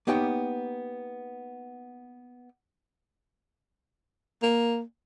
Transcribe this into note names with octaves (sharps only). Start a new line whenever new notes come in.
A#3 B3 D#4 G4 C#5 G5
A#3